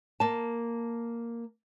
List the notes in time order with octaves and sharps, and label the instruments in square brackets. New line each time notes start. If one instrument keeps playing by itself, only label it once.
[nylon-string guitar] A#3 A5